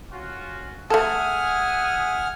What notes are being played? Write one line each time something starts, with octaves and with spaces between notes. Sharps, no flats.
C#4 F4 F#4
A3 G#4 A4 E5 F#5 G#5 D#6 F6